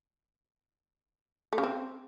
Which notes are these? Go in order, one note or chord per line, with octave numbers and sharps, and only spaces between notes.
A3
C#3
C4